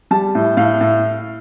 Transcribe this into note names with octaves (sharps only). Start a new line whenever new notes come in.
G3 A5
A2
A2 F5
A2